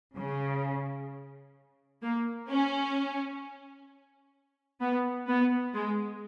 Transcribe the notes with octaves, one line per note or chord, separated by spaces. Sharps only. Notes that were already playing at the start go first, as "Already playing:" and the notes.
C#3
A#3
C#4
B3
B3
G#3